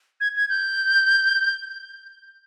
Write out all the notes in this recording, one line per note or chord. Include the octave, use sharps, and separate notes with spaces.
G#6
G#6
G6